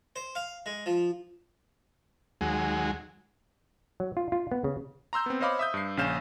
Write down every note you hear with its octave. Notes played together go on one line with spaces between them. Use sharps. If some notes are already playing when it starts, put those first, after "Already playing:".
C5
F5
G#3
F3
D#2 F#3 G#3
F#3
F4
F4
B3
C#3
A#5 C6 E6 G6
B3 C4
C5 C#5 D#5 F5 B5 D6
E5 D#6 G6
G2 C7
A#1 C#3 C#4 F5 G6 E7